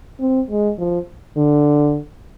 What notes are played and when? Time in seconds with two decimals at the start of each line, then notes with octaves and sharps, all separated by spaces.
0.20 C4
0.50 G#3
0.79 F3
1.37 D3